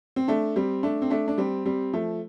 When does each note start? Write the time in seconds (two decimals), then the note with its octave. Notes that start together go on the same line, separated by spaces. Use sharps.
0.16 C4
0.28 A3 D4
0.56 G3 C4
0.83 A3 D4
1.02 C4
1.10 A3 D4
1.28 D4
1.38 G3 C4
1.66 G3 C4
1.93 F3 A3